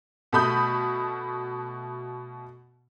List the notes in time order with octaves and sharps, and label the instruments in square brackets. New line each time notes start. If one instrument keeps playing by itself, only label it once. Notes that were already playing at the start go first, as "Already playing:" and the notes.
[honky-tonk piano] B2 A3 A4 B5 D#6 G6